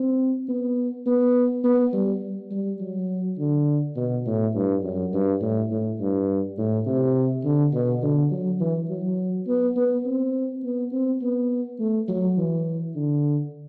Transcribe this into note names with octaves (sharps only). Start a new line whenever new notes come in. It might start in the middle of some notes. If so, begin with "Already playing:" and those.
Already playing: C4
B3
B3
B3
G3
G3
F#3
D3
B2
A2
G2
F#2
G2
A2
A2
G2
A2
C3
D3
B2
D3
F#3
E3
F#3
B3
B3
C4
B3
C4
B3
A3
F#3
E3
D3